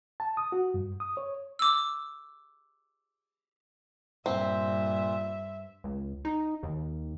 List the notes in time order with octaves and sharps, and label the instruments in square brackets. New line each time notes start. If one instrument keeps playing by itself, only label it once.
[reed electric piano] A5
D#6
F#4
G2
D#6
C#5
[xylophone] D6 E6
[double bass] G2 [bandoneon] A#2 [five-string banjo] C4 [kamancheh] E5
[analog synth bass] C#2
D#4
D#2